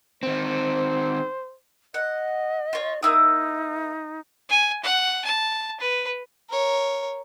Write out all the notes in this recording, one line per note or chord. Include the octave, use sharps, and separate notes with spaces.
D#3 C4 C5
D#5 F#5
F4 C#5
A#3 D#4 E4 D#6
G#5
F#5
A5
B4
A#4 C#5